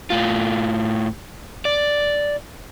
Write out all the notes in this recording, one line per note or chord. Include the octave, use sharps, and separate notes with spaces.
A2 F4
D5